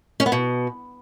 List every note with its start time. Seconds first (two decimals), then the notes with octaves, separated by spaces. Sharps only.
0.20 C#4
0.26 B3
0.32 B2